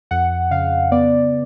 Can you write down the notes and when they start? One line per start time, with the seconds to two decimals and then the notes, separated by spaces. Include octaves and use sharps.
0.11 F2 F#5
0.51 C#3 F5
0.92 B3 D5